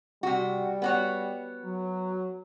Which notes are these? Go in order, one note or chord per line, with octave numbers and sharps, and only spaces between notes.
C3 G3 F#4
B3 F#4 C#5
F#3